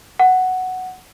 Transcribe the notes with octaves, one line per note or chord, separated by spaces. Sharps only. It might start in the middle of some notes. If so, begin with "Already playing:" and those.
F#5